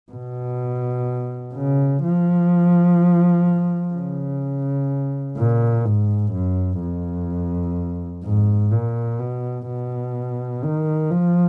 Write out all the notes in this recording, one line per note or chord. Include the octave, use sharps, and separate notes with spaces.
B2
C#3
F3
C#3
A#2
G#2
F#2
F2
G#2
A#2
B2
B2
D#3
F3